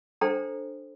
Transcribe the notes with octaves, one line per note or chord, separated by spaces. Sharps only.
D4 A4 C5 G5 A#5